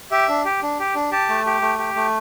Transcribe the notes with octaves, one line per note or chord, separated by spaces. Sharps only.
G4 E5
D4
G4
D4
G4
D4
G4 A5
A3
G4
A3
G4
A3